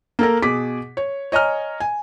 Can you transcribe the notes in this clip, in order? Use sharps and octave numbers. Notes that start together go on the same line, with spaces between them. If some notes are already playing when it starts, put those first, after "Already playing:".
A#3 A4 A#4
B2 G#4 D6 B6
C#5
C#5 D#5 G#5 A#5 F6
G#5